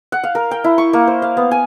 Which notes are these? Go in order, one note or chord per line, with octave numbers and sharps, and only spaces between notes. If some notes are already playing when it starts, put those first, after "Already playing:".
F#5
F5
A#4
G5
E4
C#6
A#3
C5
F5
B3
G#5